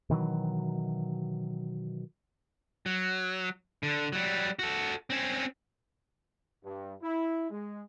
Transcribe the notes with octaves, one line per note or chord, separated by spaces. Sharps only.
B2 D#3 E3 F#3
F#3
D3
F#3 G3
F#4 A4
C4 C#4
G2
E4
G#3